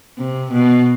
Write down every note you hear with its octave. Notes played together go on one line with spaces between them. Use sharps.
C3
B2